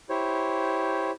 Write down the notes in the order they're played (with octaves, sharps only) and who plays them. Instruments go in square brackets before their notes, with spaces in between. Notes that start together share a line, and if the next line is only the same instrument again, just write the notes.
[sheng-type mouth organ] E4 G4 C5 C#5